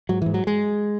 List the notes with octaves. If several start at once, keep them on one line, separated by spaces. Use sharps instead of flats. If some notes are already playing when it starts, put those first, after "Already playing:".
G#2 F#3
E3
G#2
F#3
G#3